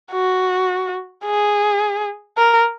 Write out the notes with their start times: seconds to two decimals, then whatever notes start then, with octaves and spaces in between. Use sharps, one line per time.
0.12 F#4
1.25 G#4
2.38 A#4